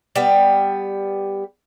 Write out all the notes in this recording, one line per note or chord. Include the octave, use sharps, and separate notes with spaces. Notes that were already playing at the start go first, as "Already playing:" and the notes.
G3 B3